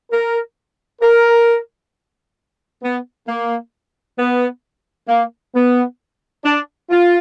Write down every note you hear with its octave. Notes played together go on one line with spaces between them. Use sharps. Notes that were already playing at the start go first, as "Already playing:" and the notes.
A#4
A#4
B3
A#3
B3
A#3
B3
D4
F4